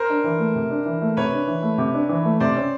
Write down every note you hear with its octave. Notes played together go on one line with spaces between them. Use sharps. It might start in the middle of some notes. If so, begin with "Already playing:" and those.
Already playing: A#4 C5
D4
E3
A3
C3
D4
E3
A3
C3 B4 C#5
D4
E3
A3
C3
D4
E3
A3
C3 C5 D5
C#4